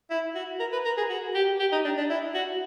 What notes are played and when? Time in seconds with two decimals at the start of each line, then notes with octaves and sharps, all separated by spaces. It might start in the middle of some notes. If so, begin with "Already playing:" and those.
0.11 E4
0.35 F#4
0.60 A#4
0.72 B4
0.85 A#4
0.98 G#4
1.10 F#4
1.35 G4
1.60 G4
1.72 D#4
1.85 D4
1.98 D4
2.10 E4
2.35 F#4